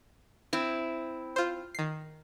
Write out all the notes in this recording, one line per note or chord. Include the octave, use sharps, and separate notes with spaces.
C4 E4
F4 C5
D#3 C7